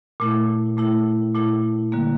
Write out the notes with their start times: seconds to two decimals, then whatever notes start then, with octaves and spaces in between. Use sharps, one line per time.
0.20 A#2 A3 E4
0.77 A#2 A3 E4
1.34 A#2 A3 E4
1.92 D3 G3 A#3